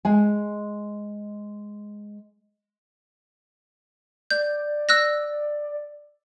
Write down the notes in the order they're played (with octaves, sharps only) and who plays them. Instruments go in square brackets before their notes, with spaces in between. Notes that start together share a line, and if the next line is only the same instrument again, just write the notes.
[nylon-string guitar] G#3 G#5
[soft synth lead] D5 [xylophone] G6
[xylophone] E6 F#6 A#6